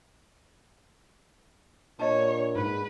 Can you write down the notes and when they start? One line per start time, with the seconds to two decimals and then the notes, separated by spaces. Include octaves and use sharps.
1.99 A#2 D4 C#5 D#5 A5
2.55 G#2 B4